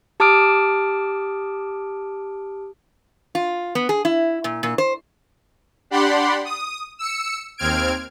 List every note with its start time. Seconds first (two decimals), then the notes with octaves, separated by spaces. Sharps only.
0.20 G4 A5 D6 D#6 F6 D7
3.35 F4
3.75 B3
3.89 G#4
4.05 E4
4.44 A#2
4.63 A#2
4.78 C5
5.90 D4 G4 D5 F#5 B5 C6
6.45 D#6
6.99 E6 C#7
7.58 D#2 C4 F6 G#6 D7